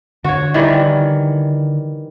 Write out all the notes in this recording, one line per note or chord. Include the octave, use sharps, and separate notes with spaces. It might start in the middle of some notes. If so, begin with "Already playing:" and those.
D3 D4 F#4 C#5
D#3 E3 G3